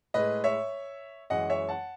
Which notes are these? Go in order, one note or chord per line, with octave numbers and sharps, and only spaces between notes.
A2 G#3 B4 D#5
C#5 E5
F#2 E3 G#3 D#5 F#5
C#5 E5
F#5 A5